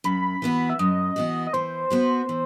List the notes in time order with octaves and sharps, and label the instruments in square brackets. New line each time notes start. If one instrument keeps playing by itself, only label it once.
[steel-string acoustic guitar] F#2 [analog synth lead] B5
[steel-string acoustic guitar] E3 B3 F#4
[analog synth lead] E5
[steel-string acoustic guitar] F#2 [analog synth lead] D#5
[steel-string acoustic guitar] E3 B3 F#4
[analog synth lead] D#5
[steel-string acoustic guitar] E3 [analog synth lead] C5
[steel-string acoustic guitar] B3 F#4 B4
E3